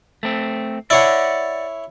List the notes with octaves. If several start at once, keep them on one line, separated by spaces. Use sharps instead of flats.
A3 C4
E4 C#5 D5 F#5